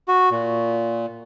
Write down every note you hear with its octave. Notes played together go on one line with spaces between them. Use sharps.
F#4
A#2